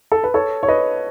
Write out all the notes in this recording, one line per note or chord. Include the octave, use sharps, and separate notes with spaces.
A4
B4
A4 C#5
C#5
B4 D#5